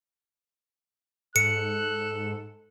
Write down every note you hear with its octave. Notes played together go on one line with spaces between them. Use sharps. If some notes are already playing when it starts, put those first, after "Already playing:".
G#2 A4 F#6 C#7